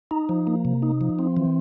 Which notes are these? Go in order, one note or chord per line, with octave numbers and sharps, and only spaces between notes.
D#4
F3
A#3
C3
D#4
F3
C4
E3